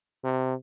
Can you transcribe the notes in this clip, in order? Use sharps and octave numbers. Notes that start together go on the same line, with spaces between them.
C3